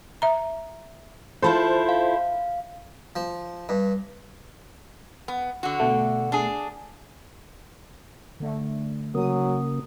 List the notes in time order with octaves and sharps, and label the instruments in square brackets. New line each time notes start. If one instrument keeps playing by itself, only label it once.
[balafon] E5 A#5
[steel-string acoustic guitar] E4 F4 A4 [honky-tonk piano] C5 A5 B5
[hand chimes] F5
[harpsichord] F3
G2
[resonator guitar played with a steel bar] B3
D3 F#4
[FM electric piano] B2 A3
[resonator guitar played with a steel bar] D4 G#4
[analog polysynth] D3 A3
[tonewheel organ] C#3 A#3 [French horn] F#3 [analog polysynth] D#6